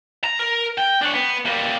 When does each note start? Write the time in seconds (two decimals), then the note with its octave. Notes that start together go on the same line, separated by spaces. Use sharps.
0.24 A#5
0.39 A#4
0.78 G5
1.01 D4 C#5
1.13 B3
1.46 G3 A#3